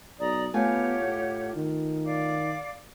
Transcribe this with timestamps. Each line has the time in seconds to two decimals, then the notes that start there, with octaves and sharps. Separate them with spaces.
0.19 B1 D5 A#5 D#6
0.54 A3 B3 F4 G4 C#5 F#5 G#5
1.02 A2
1.55 D#3
2.06 D5 F5 D6